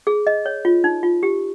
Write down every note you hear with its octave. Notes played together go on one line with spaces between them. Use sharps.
G#4
D#5
C#5
F4
D#4
F4
G4